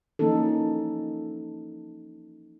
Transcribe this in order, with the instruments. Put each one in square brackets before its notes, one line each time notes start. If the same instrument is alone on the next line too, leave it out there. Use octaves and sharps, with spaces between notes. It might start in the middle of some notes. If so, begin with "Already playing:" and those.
[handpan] E3 F3 A#3 C#4 D#4 A4